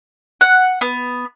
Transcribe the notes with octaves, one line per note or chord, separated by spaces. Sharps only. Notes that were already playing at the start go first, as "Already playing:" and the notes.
F#5
B3